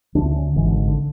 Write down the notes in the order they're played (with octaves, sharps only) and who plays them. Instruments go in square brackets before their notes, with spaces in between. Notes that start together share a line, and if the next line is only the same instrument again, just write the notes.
[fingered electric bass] D2 D4
D3
C#4
G#1 G#2 E3
D3
D3